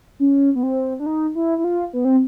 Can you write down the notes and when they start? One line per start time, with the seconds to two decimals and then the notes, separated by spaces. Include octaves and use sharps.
0.20 C#4
0.55 B3
0.63 C4
1.00 D4
1.06 D#4
1.35 E4
1.58 E4
1.64 F4
1.93 B3
2.05 C4